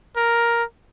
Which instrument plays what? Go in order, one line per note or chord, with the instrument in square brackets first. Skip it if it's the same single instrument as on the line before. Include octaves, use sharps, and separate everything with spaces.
[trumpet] A#4